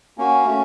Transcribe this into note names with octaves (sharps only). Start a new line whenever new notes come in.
A#3 C#4 F#4
A3 C#4